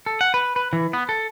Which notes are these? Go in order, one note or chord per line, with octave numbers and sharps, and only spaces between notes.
A4
F#5
B4
B4
E3
B3
A4